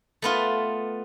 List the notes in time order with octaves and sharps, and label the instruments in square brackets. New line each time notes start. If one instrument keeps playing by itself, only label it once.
[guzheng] A3 B3 F4